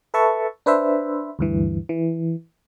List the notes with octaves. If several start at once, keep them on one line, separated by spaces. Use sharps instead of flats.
A4 B4 E5 A5 C#6
D4 B4 C5 E5
D2 G2 E3
E3